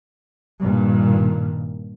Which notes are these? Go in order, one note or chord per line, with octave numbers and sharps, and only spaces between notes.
G2 A#2 D#3